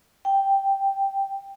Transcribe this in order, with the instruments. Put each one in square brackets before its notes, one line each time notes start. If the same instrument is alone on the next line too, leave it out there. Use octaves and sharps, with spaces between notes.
[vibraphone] G5